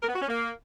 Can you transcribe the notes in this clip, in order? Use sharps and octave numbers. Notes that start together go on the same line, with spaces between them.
A#4
B3
F#4
C#4
A#3